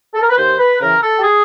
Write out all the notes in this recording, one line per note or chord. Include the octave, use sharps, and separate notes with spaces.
A4
A#4
B4
D#2 C5
B4
C#3 E3 A#4
A4
G4
G#4